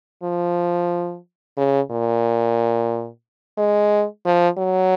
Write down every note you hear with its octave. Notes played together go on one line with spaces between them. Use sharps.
F3
C#3
A#2
G#3
F3
F#3